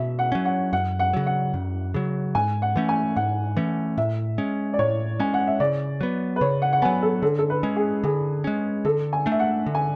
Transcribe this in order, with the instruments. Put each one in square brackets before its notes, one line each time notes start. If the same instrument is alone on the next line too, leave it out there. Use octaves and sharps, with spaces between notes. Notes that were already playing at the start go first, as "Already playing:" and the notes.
Already playing: [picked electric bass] B2 [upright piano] E5
[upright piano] F#5
[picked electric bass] F#3 C#4
[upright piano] F#5
[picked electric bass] F#2 [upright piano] F#5
[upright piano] F#5
[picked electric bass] C#3 F#3
[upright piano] F#5
[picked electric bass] F#2
C#3 F#3
[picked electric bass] G#2 [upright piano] G#5
[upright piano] F#5
[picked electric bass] E3 A3 C#4
[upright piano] G#5
[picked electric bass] G#2 [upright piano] F#5
[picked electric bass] E3 A3 C#4
[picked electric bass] A2 [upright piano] E5
[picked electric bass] G#3 C#4
[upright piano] D5
[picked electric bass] A2 [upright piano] C#5
[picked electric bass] G#3 C#4 [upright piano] G#5
[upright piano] F#5
E5
[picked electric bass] C#3 [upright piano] D5
[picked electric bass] F#3 B3
[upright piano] B4
[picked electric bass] C#3 [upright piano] C#5
[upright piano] F#5
F#5
[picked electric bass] B3 [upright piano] G#5
[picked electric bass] F#3
[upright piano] A4
[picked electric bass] D3 [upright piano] A4
[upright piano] A4
B4
[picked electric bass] G#3 C#4
[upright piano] G#4
[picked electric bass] D3 [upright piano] G#4
[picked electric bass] G#3 C#4
[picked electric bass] D3 [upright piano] A4
[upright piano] G#5
[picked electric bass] A3 D4
[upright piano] E5
F#5
[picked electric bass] D3
[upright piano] G#5